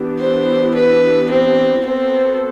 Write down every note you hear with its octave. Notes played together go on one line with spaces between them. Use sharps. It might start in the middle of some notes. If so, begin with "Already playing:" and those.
Already playing: E3 B3 D4 G4
C5
B4
C4
B3 C4 F#4 A4 C5